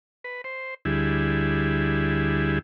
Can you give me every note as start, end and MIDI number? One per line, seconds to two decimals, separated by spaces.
0.24 0.41 71
0.44 0.74 72
0.85 2.59 38
0.85 2.59 55
0.85 2.59 64
0.85 2.59 68